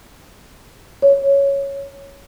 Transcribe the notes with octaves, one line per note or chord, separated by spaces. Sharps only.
C#5